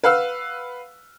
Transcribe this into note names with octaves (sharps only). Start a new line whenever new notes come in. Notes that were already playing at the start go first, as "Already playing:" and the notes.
B4 F5 F#5 E6 F6